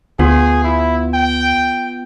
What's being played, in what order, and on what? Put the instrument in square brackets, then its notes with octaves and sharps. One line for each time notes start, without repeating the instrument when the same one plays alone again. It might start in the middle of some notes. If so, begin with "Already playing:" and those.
[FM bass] D2 [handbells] B3 F4 [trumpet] G#4
[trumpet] E4
G5